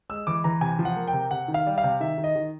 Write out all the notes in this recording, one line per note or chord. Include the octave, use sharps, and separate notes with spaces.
G#3 E6
E3 D6
E3 A#5
C3 G#5
F3
F#5
A#3
G5
C3
C3 F#5
D#3
F5
G3
F5
C3
D#3 E5
D#3
D#5
D#3